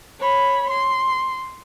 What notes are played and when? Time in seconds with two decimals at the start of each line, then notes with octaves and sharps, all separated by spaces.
0.20 C#5 B5
0.69 C6